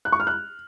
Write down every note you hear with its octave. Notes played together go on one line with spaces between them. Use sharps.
F#6
C#6
F6
F#6